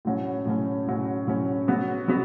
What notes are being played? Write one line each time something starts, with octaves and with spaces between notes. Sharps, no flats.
A2 F#3 C#4
A2 F#3 C#4
A2 F#3 C#4
A2 F#3 C#4
F#3 B3 F#4
F#3 B3 F#4